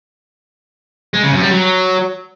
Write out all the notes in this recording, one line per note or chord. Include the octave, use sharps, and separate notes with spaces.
G#3
C#3
F#2
G3
F#3